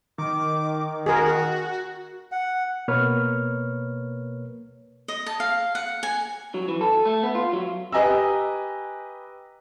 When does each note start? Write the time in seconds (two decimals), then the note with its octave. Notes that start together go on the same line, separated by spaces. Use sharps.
0.18 D#3 D6
1.06 F#4 G#4 A#4
2.32 F#5
2.88 B2 A#3 A#4 B4 C#5 F6
5.08 D#5
5.26 A5
5.40 F5
5.75 F#5
6.03 G#5
6.54 F#3
6.68 E3
6.81 A4
7.05 A3
7.23 B3
7.35 F4
7.53 F#3
7.92 G4 B4 D#5 G#5 A#5 E6